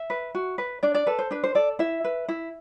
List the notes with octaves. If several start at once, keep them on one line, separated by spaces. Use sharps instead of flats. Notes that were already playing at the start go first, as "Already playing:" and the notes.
Already playing: E5
B4
F#4
B4
D4 D5
D5
A4 B4
C5
D4 B4
C5
A4 D5
E4 E5
B4
E4